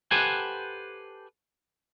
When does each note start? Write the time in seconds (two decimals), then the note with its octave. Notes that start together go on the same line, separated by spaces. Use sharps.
0.11 G4 A4 B4 C5 F#5 G#5